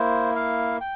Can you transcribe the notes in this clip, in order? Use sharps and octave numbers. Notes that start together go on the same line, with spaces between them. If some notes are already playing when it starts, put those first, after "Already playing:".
Already playing: A#3 E4 C5
F5
G5